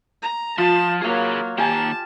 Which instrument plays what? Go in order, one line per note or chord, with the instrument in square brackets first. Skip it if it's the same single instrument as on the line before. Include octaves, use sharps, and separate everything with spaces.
[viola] A#5
[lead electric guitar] F3 [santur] F4 [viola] A5
[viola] F#3 A#3 [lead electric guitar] G#4 F5
[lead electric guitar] D#3 A#3 [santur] G4 G#5 [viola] A5